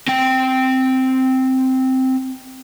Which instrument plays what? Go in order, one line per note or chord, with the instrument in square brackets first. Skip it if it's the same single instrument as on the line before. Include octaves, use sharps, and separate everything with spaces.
[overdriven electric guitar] C4 G5